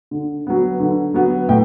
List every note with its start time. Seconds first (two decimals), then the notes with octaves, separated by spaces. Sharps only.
0.11 D3
0.47 F#3 B3
0.80 D3
1.14 F#3 B3
1.49 A2 G5